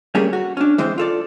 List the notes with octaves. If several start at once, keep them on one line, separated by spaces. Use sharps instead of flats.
G3 A3 A#3 C#4 G#4
F#4
C#4 D4
E3 G#3 C4 C5
F4 A4 D5